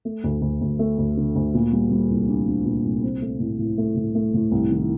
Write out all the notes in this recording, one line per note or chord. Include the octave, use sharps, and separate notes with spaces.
A3
D2
D2
D2
A3
D2
D3
D2
A#2
G3
G3
C2
D4
D4
A#2
C2
C4
A3
A2
A2
A3
A2
A3
A2
C2
D#3